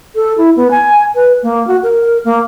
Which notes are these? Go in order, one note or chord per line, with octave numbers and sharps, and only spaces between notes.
A4
E4
B3
G#5
B4
A#3
F#4
A#4
A#3